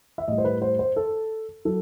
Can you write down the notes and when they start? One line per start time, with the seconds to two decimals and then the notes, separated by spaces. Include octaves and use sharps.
0.18 E5
0.28 A2 G3 D#5
0.38 C5
0.45 B4
0.62 C5
0.79 C5
0.96 A4
1.65 F#3 A4